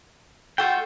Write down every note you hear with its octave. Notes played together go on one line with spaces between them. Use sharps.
A3 F4 F#4 G5 G6